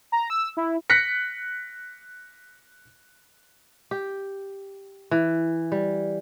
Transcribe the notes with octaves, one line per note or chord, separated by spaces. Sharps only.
A#5
E6
E4
F#6 A#6 B6 C#7
G4
E3
G3